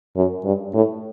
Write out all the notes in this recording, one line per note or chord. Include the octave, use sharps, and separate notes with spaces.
F#2
G2
A2